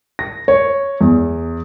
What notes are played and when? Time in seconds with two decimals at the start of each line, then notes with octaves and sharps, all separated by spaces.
0.19 A#6
0.48 C#5
1.01 E2